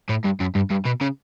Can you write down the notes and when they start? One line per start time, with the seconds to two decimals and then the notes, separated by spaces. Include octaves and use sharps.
0.09 A2
0.24 G2
0.40 F#2
0.55 G2
0.71 G2
0.86 B2
1.01 C#3